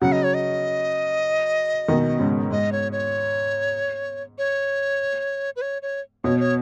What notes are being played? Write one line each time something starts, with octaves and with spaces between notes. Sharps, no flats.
C#3 F#3 F#5
D#5
C#5
D#5
B2 D#3
G#2 C#3
G#2 D#5
C#5
C#5
C#5
B4
C#5
C#5
B2 C#5
C#5